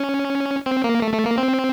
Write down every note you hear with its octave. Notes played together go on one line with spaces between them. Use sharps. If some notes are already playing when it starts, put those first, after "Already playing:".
Already playing: C#4
C4
A#3
A3
A3
A#3
C4